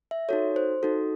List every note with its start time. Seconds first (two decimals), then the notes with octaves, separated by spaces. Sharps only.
0.11 E5
0.29 D#4 F#4 A4 C#5
0.56 C5
0.83 D#4 F#4 A4